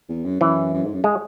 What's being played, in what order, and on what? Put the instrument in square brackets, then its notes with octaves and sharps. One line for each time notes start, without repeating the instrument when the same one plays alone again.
[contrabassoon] E2
F#2
[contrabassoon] F#2 [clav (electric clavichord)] E3
[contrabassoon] F#2
G#2
F#2
[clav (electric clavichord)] G#3